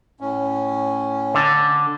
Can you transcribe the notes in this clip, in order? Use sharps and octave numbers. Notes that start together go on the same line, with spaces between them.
A2 C#4
D3